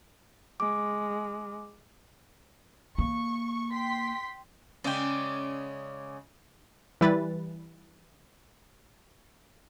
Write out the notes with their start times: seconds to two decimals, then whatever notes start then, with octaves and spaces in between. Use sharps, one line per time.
0.60 G#3 D6
2.98 A#3 C#6
3.73 G5 C6 B6
4.84 C#3 G#3 C#4 D5 G5
7.01 E3 G3 E4 B4 A6